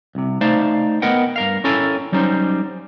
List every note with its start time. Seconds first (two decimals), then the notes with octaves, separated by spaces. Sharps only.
0.15 C2 C3
0.41 A3 D#4 C5 D5 F5 A5
1.02 B3 A#4 D#5 F#5 G5
1.36 G2 A#4 F5
1.64 C#4 E4 A4 A#4 G5 G#5
2.12 F#3 G3 C#4 D#4 C5